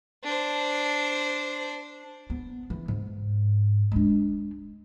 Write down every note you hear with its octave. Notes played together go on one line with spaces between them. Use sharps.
D4 C5
B3
E3
G#2
G#3 D4